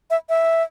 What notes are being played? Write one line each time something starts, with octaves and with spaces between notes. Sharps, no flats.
E5
E5